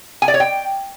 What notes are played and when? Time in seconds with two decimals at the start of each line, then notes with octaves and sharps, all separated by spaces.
0.22 G#5
0.28 D5
0.34 C#5
0.40 G5